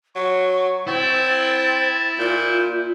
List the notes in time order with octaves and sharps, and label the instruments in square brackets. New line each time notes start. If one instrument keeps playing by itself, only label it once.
[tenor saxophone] F#3 [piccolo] C#6
[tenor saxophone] C4 [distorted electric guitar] E4 [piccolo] A6
[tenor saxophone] A#2 [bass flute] F4 [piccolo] G6